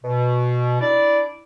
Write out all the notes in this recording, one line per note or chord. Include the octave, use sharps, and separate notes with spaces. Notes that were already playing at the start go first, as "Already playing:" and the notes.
B2
D4 E4 D5